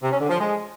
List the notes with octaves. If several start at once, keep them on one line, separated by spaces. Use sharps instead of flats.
C3
C#4
D3
F3
G#3